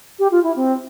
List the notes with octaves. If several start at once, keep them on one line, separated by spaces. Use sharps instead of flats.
G4
F4
E4
C4